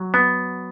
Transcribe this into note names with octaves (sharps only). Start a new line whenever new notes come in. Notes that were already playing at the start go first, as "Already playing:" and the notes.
Already playing: F#3
B3